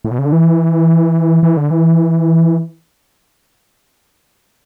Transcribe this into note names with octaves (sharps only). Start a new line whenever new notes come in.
A2
B2
C#3
D3
E3
E3
D3
E3